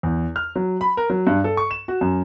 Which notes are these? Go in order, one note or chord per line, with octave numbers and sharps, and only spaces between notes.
E2
F6
F#3
B5
A#4
F#3
G2
A4
C#6
E7
F#4
F#2